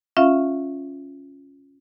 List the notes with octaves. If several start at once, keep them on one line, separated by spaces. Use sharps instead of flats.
C#4 F4 E5 F5